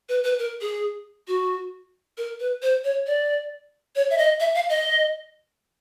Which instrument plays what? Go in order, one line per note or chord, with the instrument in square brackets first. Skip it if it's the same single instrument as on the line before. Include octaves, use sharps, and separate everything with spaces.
[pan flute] B4
B4
A#4
G#4
F#4
A#4
B4
C5
C#5
D5
C#5
E5
D#5
E5
F5
D#5